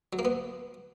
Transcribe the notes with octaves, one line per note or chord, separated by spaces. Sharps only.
F#3
A#3
B3